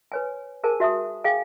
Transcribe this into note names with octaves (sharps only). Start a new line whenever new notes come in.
B4 C#5 G#5
G#4 A#4 C5 G#5 A5
F#4 E5 A5 D#6
G#4 F5 G5 G#5